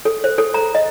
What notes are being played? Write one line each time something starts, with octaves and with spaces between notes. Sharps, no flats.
A4
C5
A4
A#5
D#5